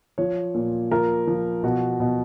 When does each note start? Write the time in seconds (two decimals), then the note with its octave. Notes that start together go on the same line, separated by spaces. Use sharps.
0.18 F3 C#5
0.54 A#2
0.91 F3 A#4
1.27 F3
1.63 B2 F#4
2.00 B2